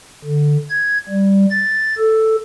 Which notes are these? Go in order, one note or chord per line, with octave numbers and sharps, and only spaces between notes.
D3
G#6
G3
A6
A4